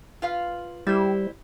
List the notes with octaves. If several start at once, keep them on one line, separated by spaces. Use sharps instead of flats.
F4 B4 F5
G3 E4 C5